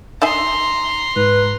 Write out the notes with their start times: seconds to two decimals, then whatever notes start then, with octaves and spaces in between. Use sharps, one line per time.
0.22 D#4 E5 G#5 A#5 C6
1.16 G#2 B4